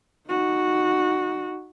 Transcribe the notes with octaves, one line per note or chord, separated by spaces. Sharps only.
D#4 F#4